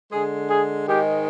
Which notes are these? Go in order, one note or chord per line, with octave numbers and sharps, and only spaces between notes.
D3 G#3 G#4
G#4
G#2 D#3 G#3 G4